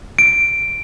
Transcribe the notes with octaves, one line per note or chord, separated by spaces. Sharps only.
D7